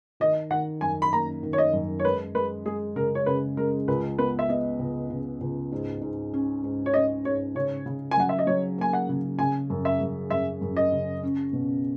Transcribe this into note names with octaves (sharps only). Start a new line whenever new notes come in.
D#3 D#5
D#3 F#5
F#2 G#5
B5
A#3 A#5
D#3
C#5
D#5
F#2
C#5
G#3 B4
G#3 B4
G#3 G#4
C#3 A#4
C#5
C#3 B4
G#3 A#4
C#2 B4
B3 B4
E5
B3 D#5
C#2
C#3
C#2
G#2
G#2
C#4
G#2
C#5
C#4 D#5
G#2 C#5
C#3 C#5
C#3
G#5
F#3 F#5
E5
D#5
F#3 C#5
A#3 G#5
F#5
C#3
C#3 G#5
F#2
E5
F#2
F#2 E5
F#2
D#5
C#3
C#4
B2